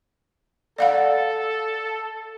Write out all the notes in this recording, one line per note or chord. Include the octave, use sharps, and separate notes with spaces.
A4 D5 F5 F#5